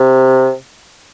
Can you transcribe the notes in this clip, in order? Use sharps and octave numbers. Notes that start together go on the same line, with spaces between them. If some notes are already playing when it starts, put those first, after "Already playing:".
Already playing: C3